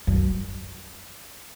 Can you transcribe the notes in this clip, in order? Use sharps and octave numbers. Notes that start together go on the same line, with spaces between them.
F#2